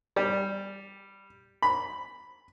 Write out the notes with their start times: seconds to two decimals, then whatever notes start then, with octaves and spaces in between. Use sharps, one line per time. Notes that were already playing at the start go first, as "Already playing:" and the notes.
0.16 G3
1.62 B5